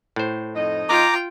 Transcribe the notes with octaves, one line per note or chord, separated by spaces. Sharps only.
A2 C5
F2 D#4 D#5
F4 G5 A#5 D6